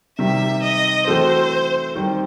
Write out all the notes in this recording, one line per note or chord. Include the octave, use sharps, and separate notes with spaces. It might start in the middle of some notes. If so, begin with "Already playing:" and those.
C3 D#3 G3 E5
D#5
E3 A3 C4 F#4 A4 C5
D#3 G3 C4